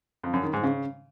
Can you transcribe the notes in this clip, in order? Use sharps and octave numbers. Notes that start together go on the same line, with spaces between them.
F2
F#2
D#3
G#2
C#3